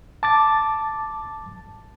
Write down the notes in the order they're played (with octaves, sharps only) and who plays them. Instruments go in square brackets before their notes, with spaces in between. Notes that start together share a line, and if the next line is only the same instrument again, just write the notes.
[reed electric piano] A5 D6 A6